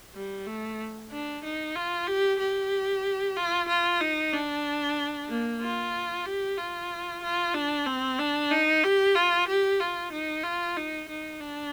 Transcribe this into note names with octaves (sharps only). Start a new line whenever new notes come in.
G3
A3
D4
D#4
F4
G4
G4
F4
F4
D#4
D4
A#3
F4
G4
F4
F4
D4
C4
D4
D#4
G4
F4
G4
F4
D#4
F4
D#4
D#4
D4